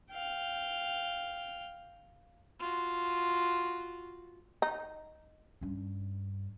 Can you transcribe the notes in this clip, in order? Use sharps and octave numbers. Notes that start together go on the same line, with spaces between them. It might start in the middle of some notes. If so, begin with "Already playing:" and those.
F5 G5
F4 F#4
D#4
G2 C#4